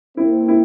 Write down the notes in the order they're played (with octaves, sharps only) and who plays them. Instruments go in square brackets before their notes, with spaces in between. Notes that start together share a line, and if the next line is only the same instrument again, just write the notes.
[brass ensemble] A#3 C4 [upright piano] E4
[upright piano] E4